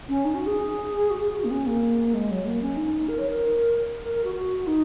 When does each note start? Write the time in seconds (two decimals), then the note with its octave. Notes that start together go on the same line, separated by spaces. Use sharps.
0.09 C#4
0.25 D#4
0.35 F#4
0.46 G#4
1.11 F#4
1.19 G#4
1.35 F#4
1.44 A#3
1.51 C#4
1.66 A#3
2.14 G#3
2.31 F#3
2.46 A#3
2.62 C#4
2.77 D#4
3.08 A#4
3.19 C#5
3.28 A#4
4.04 A#4
4.15 A#4
4.24 F#4
4.35 F#4
4.67 D#4